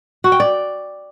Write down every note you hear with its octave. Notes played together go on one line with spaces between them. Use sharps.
F#4
G5
D5